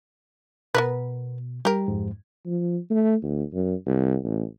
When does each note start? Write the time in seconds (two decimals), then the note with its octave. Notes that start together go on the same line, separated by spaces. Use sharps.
0.74 B2 B3 A#4 B4
1.65 G3 G4 A#4
1.88 F2 G#2
2.46 F3
2.90 A3
3.23 D2
3.53 F#2
3.86 C2
4.24 A1